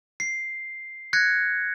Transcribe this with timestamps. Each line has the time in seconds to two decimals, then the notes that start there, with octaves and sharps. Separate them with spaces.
0.20 C7
1.13 F#6 G#6 A#6 C#7